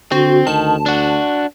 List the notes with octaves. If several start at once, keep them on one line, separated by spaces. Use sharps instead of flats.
D3 C4 F#4
D2 D#3 A5
D4 F#4